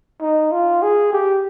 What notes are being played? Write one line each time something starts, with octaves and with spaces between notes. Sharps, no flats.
D#4
F4
G#4
G4